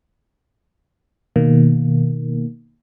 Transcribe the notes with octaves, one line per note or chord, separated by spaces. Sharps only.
B2 D#3 A#3